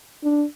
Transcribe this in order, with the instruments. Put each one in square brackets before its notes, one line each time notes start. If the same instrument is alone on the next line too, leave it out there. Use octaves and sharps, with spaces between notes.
[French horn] D4